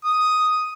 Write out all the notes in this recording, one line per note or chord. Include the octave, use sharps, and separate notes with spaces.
D#6